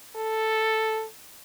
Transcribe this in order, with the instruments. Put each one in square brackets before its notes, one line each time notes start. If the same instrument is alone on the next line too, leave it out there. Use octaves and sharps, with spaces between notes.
[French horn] A4